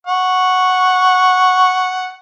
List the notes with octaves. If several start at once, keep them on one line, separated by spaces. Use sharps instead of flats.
F#5 C#6